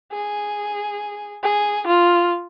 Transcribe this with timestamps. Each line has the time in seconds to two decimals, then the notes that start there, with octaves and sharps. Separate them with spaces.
0.12 G#4
1.43 G#4
1.87 F4